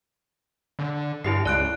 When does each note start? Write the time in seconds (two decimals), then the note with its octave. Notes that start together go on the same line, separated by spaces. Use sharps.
0.79 D3
1.24 G2 E4 G4 C7
1.45 C#2 D5 F#6 D7